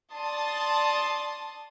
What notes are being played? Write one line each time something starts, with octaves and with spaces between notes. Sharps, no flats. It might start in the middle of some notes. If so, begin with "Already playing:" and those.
D5 A5 C6 D#6